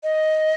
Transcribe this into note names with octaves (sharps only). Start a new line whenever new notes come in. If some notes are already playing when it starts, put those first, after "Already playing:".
D#5